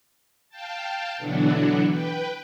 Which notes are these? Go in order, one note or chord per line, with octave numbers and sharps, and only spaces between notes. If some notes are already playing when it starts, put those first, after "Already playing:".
F5 G5 A5
B2 D3 E3 F#3 D4 F#4
B4 G5